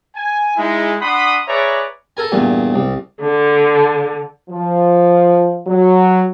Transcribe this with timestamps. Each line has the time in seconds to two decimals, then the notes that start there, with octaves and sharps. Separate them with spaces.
0.15 G#5
0.57 G#3 D#4 E4
1.01 D4 F#5 B5 C6 D#6
1.48 G#4 B4 C#5 D5 E5 A#5
2.17 A4 A#4 G#5
2.32 E2 G2 A#2
2.74 C2
3.21 D3
4.50 F3
5.67 F#3